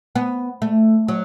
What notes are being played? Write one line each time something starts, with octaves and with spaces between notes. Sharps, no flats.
B3
A3
F#3